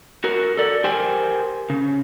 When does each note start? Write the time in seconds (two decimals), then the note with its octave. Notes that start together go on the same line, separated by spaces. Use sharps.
0.24 F#4 A#4
0.57 A4 D5
0.84 G4 A#4 C5 G5 G#5
1.70 C#3